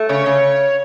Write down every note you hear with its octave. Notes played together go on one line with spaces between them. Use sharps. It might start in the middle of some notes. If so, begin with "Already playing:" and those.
Already playing: A3
C#3 C#5
C#3